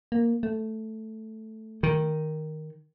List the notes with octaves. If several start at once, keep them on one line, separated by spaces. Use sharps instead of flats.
A#3
A3
D#3